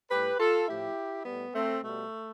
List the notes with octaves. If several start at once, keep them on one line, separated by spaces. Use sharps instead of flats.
A2 G3 G4 B4
F4 A4
A2 F3 A3 E4 G4
A2 G3 B3
A3 C4
B2 G3 A3